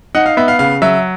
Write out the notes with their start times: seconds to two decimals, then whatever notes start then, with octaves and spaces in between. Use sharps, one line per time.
0.15 D#4 F#5
0.26 F5
0.37 B3 E5
0.48 F5
0.59 C#3 F5
0.82 F#3 E5